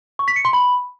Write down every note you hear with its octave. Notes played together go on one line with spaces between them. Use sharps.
C#6
B6
C#7
C6
B5